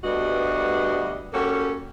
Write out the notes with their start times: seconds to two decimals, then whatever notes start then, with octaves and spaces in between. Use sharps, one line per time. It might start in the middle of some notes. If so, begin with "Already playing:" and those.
0.03 D2 G2 G3 B3 F#4 D#5
1.33 G3 A#3 C#4 F#4 G4 A4